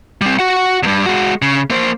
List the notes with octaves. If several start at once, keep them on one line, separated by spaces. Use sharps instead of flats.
G3 C4
F#4 F#5
E2 G2
G#3 F#4
C#3
A#3 C5